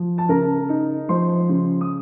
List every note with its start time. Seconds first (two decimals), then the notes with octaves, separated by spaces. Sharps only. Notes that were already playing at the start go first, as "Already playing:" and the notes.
Already playing: F3
0.18 A5
0.29 C#3 A#4 A#5
0.69 D#4
1.09 F3 C5 C6
1.49 C#3
1.81 D#6